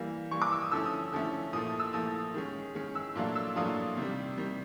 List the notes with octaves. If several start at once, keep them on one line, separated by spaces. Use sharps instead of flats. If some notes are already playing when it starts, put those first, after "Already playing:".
Already playing: E3 G3 A#3
E3 G3 A#3 C#6
D6
E6
D#6
D3 F3 A3 C#4 E4 E6
D#6
D3 F3 A3 C#4 E4
A#2 F3 A3 D#6
D#6
E6
A#2 F3 A3 D#6
D#3 G#3 C#4
D#3 G#3 C#4
E6
A#2 F#3 A3 D4 F4
E6
A#2 F#3 A3 D4 F4 D#6
C3 D#3 G3
C3 D#3 G3